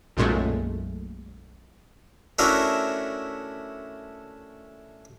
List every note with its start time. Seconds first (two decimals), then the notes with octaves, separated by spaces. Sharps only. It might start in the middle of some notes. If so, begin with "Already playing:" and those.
0.17 B1 F#2 A#2 G#3 A3
2.39 A3 C#4 D4 E4 F#4 A#4